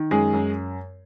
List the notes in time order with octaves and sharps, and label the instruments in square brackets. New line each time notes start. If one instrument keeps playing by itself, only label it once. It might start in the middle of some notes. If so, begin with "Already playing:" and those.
Already playing: [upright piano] D#3
F#2 G#3 G#4
F#2